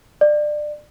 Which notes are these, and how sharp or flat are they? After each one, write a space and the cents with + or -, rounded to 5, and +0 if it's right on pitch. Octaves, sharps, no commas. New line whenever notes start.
D5 +25